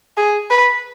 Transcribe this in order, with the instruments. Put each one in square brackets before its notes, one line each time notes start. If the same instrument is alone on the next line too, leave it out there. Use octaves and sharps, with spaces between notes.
[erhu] G#4
B4